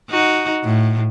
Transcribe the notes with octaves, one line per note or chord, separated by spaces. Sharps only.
D#4 F#4
A2